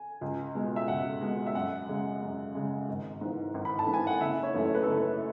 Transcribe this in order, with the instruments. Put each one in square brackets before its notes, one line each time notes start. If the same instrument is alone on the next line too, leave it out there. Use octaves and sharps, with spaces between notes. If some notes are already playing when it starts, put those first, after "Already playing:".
Already playing: [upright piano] G#5
C#2
B2 G#3
E5
C#2 F#5
B2 G#3
E5
F#2 F#5
C#3 G#3
F#2
C#3 G#3
G#1
G#2 E3
G#1
B5
A5
G#2 E3
G#5
F#5
F#1 E5
C#5
F#2 E3 A3
C#5
B4
F#1 A4
B4